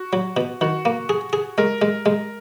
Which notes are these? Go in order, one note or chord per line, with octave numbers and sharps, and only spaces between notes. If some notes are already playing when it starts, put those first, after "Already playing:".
Already playing: F#4
F#3
B2
D#3 F#4
A#3
G#4
G#4
G#3 A#4
G#3
G#3